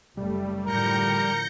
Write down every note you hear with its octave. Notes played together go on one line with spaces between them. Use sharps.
F#1 G3 A3
A2 D3 F3 A#4 G6 A#6 C#7